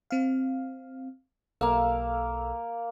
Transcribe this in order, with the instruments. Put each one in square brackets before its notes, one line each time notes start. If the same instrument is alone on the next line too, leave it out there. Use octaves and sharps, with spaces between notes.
[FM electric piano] C4 F5
[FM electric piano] B1 A4 E6 [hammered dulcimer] A#3 F5